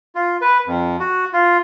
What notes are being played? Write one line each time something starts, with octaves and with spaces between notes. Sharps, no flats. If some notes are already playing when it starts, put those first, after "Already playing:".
F4
B4
F2
F#4
F4